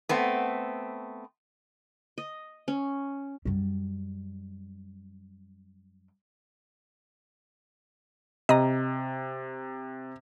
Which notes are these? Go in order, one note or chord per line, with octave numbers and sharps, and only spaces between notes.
A3 B3 C4
D#5
C#4
F#2 G3
C3 D#5 A#5